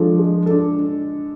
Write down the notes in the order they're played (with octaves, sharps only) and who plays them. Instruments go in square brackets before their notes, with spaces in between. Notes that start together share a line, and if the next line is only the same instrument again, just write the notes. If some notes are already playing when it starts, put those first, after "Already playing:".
Already playing: [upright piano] F3 [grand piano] G#3 D4 A4
[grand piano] G#3
D4 A4